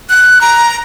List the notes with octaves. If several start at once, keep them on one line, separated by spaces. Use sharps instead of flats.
F#6
A#5